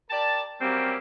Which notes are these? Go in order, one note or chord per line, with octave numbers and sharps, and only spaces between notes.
G4 A#4 D5 A5
F#3 G3 A#3 C4 C#4 G4